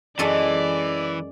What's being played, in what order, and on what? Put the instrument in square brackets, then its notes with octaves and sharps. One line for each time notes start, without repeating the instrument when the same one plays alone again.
[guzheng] F#2 G#3 A4 [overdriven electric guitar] E3 [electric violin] D5